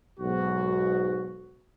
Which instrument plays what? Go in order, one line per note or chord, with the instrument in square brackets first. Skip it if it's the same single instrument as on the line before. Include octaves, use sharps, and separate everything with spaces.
[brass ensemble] B1 G#2 F#4